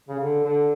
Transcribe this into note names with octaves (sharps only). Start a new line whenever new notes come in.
C#3
D3
D3